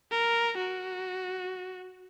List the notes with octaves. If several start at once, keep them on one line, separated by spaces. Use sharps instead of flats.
A#4
F#4